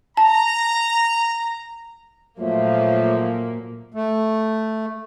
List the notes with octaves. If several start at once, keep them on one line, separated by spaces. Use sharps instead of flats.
A5 A#5
A#2 F3 F#3 A3 A#3
A3